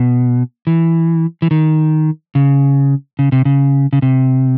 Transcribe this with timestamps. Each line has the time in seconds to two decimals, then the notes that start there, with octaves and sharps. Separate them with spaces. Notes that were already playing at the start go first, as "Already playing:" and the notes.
Already playing: B2
0.67 E3
1.42 E3
1.51 D#3
2.35 C#3
3.19 C#3
3.32 C3
3.45 C#3
3.93 C#3
4.02 C3